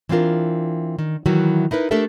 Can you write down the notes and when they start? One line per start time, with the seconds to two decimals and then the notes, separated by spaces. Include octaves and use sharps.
0.09 E3 C4 D4 F4 A#4
0.99 D#3
1.26 D#3 E3 F#3 E4 F#4
1.71 D#4 E4 A#4 B4
1.91 A3 D4 G4 A4 A#4 E5